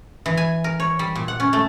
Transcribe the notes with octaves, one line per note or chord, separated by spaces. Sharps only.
E3
G#5
A#4
C#5
G3
A#2
F#5
C#4
A3